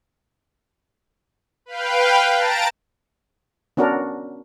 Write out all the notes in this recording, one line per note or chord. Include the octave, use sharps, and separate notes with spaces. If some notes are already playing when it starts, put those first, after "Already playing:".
B4 F5 G5
A5 A#5 A6 D7
B3 C#4 D4 F#4 A#4